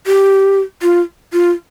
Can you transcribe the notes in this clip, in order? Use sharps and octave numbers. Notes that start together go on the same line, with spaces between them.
G4
F4
F4